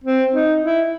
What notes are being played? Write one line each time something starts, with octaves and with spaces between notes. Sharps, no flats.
C4
D#4
E4